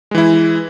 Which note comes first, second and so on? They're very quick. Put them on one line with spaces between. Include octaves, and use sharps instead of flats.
G#3 E3 E4